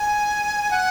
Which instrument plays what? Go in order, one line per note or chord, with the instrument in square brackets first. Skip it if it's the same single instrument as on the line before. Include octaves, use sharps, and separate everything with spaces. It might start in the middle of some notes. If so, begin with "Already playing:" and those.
Already playing: [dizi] G#5
F#5